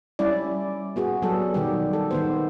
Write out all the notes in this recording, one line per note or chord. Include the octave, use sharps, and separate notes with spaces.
G3 C#4 E4 D5
B3 F#4 G#4
F#3 G3 B3 A4
B2 D#3 G3 G4
A4
D#3 B3 C5